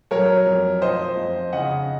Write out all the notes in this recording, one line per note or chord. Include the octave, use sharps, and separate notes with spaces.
F#3 A#4 C#5
F2
F3 C5 D#5
F2
C#3 D#5 F#5